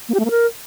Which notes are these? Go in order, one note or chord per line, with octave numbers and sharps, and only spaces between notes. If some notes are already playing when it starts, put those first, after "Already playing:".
A#3
G4
A3
A#3
A#4